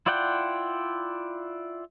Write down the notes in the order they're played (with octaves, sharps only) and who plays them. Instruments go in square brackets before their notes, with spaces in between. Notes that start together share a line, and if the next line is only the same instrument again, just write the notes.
[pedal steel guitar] E4 F4 D5 F#5 G5